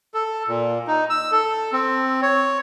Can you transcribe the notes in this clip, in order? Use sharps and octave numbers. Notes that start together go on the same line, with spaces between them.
A4
A#2
D#4
E6
A4
C4
C#5